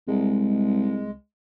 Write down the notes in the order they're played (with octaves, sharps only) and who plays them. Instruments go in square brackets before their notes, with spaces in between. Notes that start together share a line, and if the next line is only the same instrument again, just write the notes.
[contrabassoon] C2 [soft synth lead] G#3